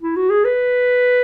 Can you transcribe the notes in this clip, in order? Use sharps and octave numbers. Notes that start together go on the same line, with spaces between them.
E4
F#4
G#4
B4